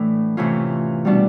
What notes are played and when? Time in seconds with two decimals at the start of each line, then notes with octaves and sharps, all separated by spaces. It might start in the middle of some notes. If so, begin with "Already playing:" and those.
Already playing: A2 E3 A3 D4
0.37 C3 E3 A3 C#4 F4
1.05 B2 G3 B3 D4